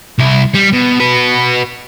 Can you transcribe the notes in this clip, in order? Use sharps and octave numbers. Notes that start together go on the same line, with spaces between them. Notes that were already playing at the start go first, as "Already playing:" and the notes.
C2 E4
G3
B2
F#4 B4